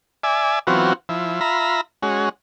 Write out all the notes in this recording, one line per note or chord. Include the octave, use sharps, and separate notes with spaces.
D5 E5 G#5
E3 F#3 B3 C4 F4 F#4
F3 E4
F4 E5 A#5 B5
G#3 C#4 F#4